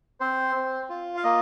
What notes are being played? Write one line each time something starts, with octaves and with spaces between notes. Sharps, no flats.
C4 C5
C4
F4
F5
A#3 D#5